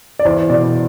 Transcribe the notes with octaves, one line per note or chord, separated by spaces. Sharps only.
D5
E2 C5
B2 D5